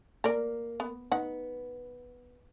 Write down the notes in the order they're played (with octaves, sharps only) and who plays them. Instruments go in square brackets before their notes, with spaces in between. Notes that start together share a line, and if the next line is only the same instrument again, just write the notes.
[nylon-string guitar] A#3 [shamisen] A#4 D5
[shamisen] B3
[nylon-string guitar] B3 [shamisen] D#4 F#5